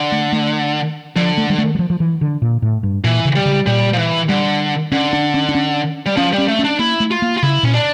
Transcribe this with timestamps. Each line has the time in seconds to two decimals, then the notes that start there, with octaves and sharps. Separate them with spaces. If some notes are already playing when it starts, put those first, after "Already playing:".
Already playing: D3
0.12 A3
0.33 A3
1.16 D3 F3
1.38 A3
1.50 G3
1.58 A3
1.75 G3
1.79 F3
1.90 F3
2.00 E3
2.21 D3
2.42 A#2
2.62 A2
2.83 G2
3.04 A#2 E3
3.25 C#3
3.36 G3
3.45 C#3
3.66 A#2 G3
3.93 F3
3.98 E3
4.29 D3 G3
4.92 D3 C#4
5.13 D4
5.34 C#4
5.49 D4
5.55 C#4
6.06 G3
6.17 F3 C#4
6.33 G3
6.38 C#4
6.48 A3
6.59 C#4
6.64 D4
6.79 A#3 E4
7.00 A3
7.11 F4
7.22 A#3
7.37 F4
7.43 C#3 E4
7.63 A#2 C#4
7.74 D4